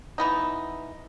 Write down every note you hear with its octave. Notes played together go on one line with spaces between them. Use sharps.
E3 B3 D#4